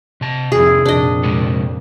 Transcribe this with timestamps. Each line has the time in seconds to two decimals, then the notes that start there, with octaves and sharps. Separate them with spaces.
0.21 C3 A5
0.52 F2 C3 D#3 E4 G#4
0.85 F2 A#2 D4 D#5
1.23 C3 G#3 A4